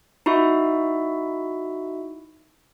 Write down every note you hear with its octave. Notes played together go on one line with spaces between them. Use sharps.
D#4 E4 F#4 E5